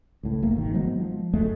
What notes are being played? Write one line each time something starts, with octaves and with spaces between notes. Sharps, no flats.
C#2 A2
F1 A3 A#3
G#1 D#3
F3 F#3 G#3 B3
F3
G1 F#2 G#3 A3